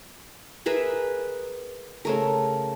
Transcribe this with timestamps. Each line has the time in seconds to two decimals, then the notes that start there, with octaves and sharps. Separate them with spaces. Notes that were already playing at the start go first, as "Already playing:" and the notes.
0.66 G#4 A#4 B4 E5
2.05 C#3 A3 A#4